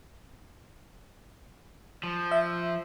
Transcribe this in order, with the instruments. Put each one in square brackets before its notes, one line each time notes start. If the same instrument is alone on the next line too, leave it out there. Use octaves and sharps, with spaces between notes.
[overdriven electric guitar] F3
[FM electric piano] E5